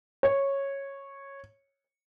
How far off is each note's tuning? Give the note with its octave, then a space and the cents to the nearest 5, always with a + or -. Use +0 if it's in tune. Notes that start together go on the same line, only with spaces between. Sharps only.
C#5 -10